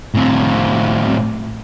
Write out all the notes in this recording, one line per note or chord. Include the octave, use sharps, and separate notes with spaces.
A2 C4